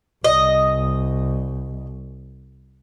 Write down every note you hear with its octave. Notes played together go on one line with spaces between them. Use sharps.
C2 D#5